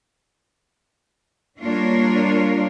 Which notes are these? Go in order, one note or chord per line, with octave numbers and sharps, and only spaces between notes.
G3 A#3 D4 F4 A#4 C#5